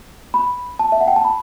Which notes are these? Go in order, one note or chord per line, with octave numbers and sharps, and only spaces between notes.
B5
A5
E5
F#5
G5
A5
B5